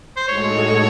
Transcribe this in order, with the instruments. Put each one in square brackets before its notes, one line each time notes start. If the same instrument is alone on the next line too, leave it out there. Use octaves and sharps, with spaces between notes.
[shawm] C5
[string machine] A2 G#3 D#4 F#4 A4 [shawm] C#5